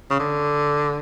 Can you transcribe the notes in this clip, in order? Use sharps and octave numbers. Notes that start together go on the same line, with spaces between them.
C#3
D3